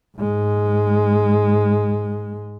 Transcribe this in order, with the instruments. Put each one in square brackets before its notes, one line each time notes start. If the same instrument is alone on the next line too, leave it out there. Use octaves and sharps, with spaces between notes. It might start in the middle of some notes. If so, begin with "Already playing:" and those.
[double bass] G#2 G#3